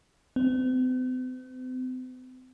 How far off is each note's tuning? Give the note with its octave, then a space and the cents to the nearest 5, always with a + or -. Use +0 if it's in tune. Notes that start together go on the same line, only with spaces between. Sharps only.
C4 -45